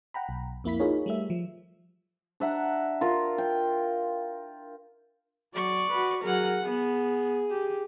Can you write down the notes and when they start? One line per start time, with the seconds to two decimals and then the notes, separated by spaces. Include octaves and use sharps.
0.14 F#5 G5 A#5 B5
0.29 B1
0.64 F2 A#3 E4 B5 B6
0.80 D#4 F4 G#4 A#4 C#5
1.06 G3 A3 E5
1.30 F3
2.40 D4 E5 F#5 A#5
3.01 F4 A#4
3.38 G5
5.54 F#3 D5 C#6
5.90 F#4 B4
6.23 F#3 G#4 A#4 F#5
6.63 B3 G#4
7.50 G4